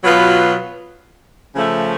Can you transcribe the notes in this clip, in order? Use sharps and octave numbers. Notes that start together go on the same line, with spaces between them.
B2 F#3 B3 F4 B4
C#3 F3 A3